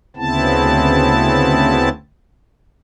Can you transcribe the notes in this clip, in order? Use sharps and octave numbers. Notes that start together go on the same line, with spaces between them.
D2 C#3 B3 C4 E4 A5